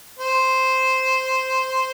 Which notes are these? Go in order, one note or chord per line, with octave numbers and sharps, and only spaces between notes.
C5